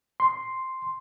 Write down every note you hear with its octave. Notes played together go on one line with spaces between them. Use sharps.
C6